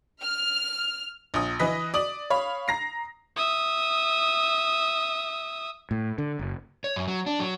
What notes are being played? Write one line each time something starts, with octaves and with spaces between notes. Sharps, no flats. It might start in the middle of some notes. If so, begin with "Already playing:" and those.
F6
A#1 D#6
E3 B4 D#5 B6
D5 D#6 F#7
C#5 F5 B5
A#5 A#6 C7
E5 D#6
A2
D3
F#1
C#5
F#2
F#3
D4
F#3